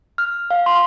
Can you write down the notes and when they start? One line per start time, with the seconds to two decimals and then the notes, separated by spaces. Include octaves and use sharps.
0.18 F6
0.51 F5
0.66 C6